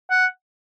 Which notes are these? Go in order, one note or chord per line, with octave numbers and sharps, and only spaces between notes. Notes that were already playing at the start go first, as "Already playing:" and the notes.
F#5